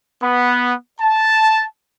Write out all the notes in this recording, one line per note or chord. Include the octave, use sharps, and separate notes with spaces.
B3
A5